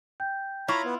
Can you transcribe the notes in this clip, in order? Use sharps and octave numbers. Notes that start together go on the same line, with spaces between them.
G5 G6
E4 F4 C#5 F5 A#5 B5 G#6
B3